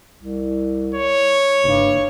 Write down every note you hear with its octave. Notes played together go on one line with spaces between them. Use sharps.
C2
C#5
F#1 G2